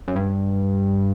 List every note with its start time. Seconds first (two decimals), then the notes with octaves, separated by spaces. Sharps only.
0.08 F#2
0.16 G2